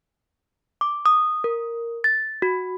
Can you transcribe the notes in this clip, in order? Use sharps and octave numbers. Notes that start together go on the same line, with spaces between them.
D6
D#6
A#4
A6
F#4